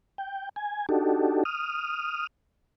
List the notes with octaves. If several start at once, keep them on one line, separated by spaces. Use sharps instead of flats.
G5
G#5
D4 D#4 F#4 G4 A4
D#6 F6